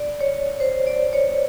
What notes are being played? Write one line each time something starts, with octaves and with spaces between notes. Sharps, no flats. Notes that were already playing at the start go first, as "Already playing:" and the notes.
Already playing: D5
C#5
C5
D5
C#5